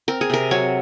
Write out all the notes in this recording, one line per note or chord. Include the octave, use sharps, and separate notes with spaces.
C4 A#4
G#4
C3 A#4
F#3 C#5